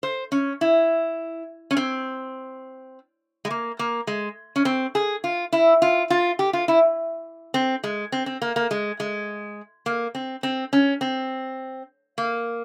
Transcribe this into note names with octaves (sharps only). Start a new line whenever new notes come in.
C5
C#4
E4
C#4
C4
G#3
A#3
A#3
G#3
C#4
C4
G#4
F4
E4
F4
F4
G4
F4
E4
C4
G#3
C4
C4
A#3
A#3
G#3
G#3
A#3
C4
C4
C#4
C4
A#3